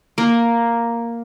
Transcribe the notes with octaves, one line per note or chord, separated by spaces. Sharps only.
A#3